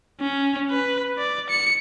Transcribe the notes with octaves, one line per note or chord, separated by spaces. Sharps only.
C#4
B4
D5
C#7